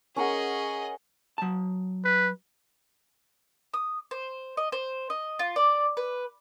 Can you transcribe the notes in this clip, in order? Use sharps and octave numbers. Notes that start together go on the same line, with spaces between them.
C#4 G#4 A#4 D#5 F#5
F#3 A5
B4
D#6
C5
D#5
C5
D#5
F4
D5
B4